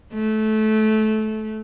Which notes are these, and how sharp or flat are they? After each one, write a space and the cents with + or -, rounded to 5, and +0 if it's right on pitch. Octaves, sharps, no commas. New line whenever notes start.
A3 -20